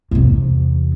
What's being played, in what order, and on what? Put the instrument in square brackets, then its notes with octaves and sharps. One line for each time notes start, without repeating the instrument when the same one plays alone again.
[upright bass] E2 C3